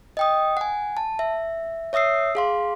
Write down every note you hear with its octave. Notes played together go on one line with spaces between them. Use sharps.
D#5 G5 D#6
F#5 G#5
A5
E5
C#5 E5 D#6 E6 C7
G#4 F5 C6